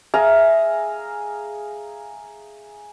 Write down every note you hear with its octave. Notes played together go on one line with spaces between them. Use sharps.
G#4 E5 F5 A#5